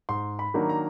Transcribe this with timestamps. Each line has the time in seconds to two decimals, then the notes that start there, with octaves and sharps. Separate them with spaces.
0.09 G#2 C6
0.39 B5
0.54 D#3 F#3 A#3 D4
0.69 A#5